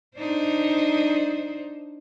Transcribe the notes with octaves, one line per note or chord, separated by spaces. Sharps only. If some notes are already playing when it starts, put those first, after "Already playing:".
D4 D#4 C5